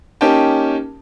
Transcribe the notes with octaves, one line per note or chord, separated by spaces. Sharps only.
A#3 C#4 D#4 G4 G5 A5